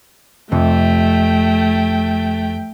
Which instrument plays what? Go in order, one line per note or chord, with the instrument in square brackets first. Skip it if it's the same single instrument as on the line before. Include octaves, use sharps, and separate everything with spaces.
[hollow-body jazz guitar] F2 C3 [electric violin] A3 G5